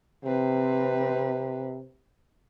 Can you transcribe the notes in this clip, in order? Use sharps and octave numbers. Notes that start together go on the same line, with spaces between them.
C3 C4 B4